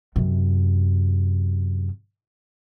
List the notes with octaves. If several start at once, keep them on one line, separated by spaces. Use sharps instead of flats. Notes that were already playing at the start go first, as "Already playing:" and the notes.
F#2 C3